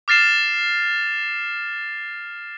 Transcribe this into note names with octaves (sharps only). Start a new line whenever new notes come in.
D6 F6 A6 C7 E7